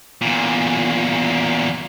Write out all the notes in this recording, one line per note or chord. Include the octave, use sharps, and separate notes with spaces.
E2 A#2